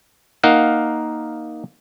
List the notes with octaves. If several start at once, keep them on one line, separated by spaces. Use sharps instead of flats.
A#3 D#4 A#4 F5 F#5